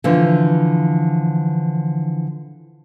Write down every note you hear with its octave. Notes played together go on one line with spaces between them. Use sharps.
D3 E3 F3